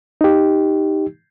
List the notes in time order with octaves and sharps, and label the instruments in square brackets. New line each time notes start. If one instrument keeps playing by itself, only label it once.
[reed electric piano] D#4 G4